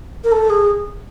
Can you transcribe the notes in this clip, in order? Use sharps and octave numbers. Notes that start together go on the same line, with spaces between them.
A#4
A4
G#4